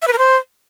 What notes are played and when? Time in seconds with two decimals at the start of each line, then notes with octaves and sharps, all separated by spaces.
0.02 E5
0.08 B4
0.13 A#4
0.18 C5